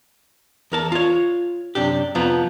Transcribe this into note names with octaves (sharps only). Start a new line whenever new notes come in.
E2 A#4 A5
F4 C#5
F#2 C3 D4 G4
F2 C3 F3 B3 F4 A#5